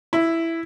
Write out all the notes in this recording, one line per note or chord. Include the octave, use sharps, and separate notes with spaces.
E4